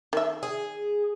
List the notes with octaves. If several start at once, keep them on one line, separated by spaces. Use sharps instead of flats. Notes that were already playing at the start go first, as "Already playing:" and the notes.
D#3 E5
G#4